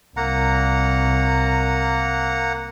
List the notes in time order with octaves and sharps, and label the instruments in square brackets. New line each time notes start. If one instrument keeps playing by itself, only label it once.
[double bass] C2 [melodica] A#3 F#5 A#5